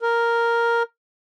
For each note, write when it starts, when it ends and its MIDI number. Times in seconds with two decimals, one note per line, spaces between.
0.01 0.83 70